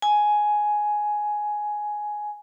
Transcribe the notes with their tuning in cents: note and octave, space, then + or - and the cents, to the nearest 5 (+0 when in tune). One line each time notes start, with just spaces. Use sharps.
G#5 +10